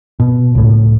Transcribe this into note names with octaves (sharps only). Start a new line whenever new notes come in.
B2
C#2 A2